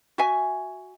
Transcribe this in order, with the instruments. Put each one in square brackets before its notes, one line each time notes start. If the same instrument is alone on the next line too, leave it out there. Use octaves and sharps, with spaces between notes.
[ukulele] F#4 E5 G#5